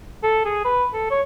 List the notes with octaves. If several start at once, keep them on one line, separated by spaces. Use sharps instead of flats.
A4
G#4
B4
A4
C#5